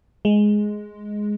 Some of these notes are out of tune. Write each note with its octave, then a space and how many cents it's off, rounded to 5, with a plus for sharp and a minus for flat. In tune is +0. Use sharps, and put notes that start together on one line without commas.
G#3 +5